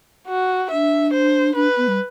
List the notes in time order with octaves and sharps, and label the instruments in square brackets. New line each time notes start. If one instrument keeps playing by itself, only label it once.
[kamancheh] F#4
[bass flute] D4 [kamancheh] E5
[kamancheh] C5
[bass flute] D4 [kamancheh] B4
[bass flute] B3
G3